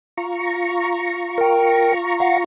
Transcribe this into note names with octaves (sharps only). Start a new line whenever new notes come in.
F4 A#5 C#6
A#4 G5
F5 F#5